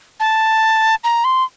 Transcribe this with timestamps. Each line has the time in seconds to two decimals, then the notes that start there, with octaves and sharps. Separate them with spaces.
0.20 A5
1.04 A#5
1.24 C6